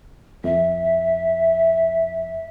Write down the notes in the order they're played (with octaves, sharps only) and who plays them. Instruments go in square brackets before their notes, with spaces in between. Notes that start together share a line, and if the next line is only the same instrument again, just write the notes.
[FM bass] F2 [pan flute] E5